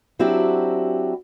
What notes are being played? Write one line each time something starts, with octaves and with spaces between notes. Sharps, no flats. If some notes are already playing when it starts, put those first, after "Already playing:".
F#3 C4 D4 E4 F#4 G4